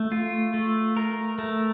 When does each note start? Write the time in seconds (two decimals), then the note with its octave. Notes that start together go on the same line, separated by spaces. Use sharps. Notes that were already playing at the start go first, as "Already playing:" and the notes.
Already playing: A3
0.12 F4
0.54 A3
0.97 A#4
1.39 A3